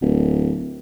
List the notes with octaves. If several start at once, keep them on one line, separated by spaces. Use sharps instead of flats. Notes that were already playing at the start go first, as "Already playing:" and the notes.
D1